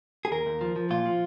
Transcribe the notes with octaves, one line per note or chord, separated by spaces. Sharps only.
G#4
D#2 A#4
D#2
F3
F3
A#2 F4
F3